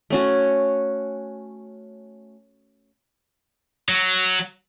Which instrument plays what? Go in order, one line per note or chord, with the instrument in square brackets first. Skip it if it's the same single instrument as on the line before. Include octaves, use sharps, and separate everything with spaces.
[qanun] A3 C#4 F#4
[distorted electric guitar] F#3